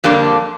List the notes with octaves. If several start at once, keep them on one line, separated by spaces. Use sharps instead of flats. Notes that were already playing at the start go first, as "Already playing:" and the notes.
F2 D3 G3 A#3 D4